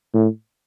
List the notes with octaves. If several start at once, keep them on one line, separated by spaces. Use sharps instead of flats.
A2